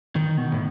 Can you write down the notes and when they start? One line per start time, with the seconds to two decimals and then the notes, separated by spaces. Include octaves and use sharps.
0.16 D#3
0.37 B2
0.52 A2